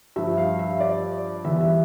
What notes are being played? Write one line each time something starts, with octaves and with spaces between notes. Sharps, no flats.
G2 F3 E5
F5
E5
D5
E2 E3 G3 E5
E5